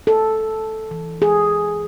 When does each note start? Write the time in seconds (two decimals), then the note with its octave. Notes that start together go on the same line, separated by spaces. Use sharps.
0.07 A4
0.91 E3
1.22 G#4